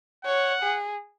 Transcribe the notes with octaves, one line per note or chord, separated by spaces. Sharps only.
C#5 F#5
G#4